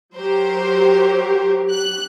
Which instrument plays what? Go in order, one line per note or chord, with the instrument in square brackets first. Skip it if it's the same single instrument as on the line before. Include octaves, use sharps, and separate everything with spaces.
[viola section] F#3 G4 [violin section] A#4 C5
[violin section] F#6